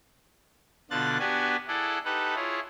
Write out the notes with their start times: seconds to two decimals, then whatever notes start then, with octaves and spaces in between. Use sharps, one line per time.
0.91 B2 D3 D4 F4 F#6 A6
1.19 B3 D4 F#4 G4 B4 G#5
1.68 E4 G#4 A4 D5 F#5
2.05 D#4 G4 A4 B4 F#5
2.36 E4 F4 G#4 C#5